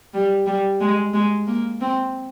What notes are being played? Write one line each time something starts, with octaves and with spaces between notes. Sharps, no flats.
G3
G3
G#3
G#3
A#3
C4